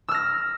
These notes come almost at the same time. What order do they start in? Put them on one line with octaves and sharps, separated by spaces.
E6 F6 A#6